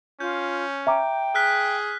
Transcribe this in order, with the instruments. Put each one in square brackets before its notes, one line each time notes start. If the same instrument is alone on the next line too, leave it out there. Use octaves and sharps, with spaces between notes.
[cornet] C#4 [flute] F4 [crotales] G6
[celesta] E5 A#5 D6 [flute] G5
[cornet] G#4 [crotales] F6 F#6 B6